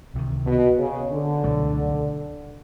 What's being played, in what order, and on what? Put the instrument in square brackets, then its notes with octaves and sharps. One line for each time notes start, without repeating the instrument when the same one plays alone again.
[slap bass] C#2 C3 D#3
[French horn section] B2
C#3
D3
[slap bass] C#2 B2 F#3 A3